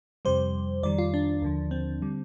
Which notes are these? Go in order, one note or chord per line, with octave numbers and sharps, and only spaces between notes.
F2 C3 G3 C5
F2 D#3 G3 D5
F4
D4
D#2 D3 F3
C4
D3 G3